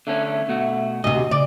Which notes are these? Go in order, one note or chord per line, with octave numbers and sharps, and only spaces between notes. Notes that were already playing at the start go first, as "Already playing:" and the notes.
D3 A3 C#4 E5
B2 A3 F#4
D2 C3 F#4 D#5
C#3 D5